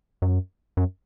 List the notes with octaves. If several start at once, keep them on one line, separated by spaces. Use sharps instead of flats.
F#2
F#2